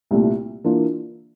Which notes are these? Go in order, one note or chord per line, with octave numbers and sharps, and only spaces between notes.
C2 A#2 A3
E3 A#3 D4 F4